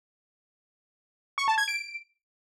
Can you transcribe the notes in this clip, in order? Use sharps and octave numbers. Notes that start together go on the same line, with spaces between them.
C#6
A5
G#6
D7